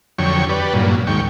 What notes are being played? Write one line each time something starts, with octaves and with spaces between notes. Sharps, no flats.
F2 D3 F#3 C#5 G5 C#6
G4 B4 D5
G2 A#2 F#3
D#2 G#2 G5 C#6